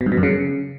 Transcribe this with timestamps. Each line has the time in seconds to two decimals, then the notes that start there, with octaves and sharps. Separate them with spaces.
0.01 B2
0.06 G2
0.12 B2
0.17 F#2
0.23 C#3